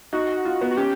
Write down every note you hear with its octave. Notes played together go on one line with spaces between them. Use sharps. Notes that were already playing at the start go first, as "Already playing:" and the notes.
D#4 F#4
F4
B3
F#4
C#4 G4